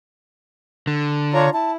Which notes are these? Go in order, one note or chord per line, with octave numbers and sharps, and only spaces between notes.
D3
D4 F4 C#5 A#5
E4 A5